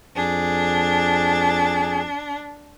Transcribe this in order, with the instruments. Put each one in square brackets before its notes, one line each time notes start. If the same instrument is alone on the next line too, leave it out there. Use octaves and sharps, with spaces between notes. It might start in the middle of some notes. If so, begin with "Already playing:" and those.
[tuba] F2 [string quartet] D4 [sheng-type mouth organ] G#4